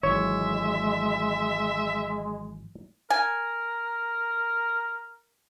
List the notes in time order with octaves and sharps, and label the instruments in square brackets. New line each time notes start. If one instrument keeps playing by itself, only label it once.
[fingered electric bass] G#1 E3 F#3 [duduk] G#3 [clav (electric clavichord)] C#5 [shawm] E5
[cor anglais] A#4 [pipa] G#5